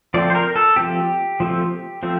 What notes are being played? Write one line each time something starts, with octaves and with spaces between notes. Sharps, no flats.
F3 A3 C4 D5
C5
A#4
A4
F3 A3 C4 G4
F3 A3 C4
F3 A3 C4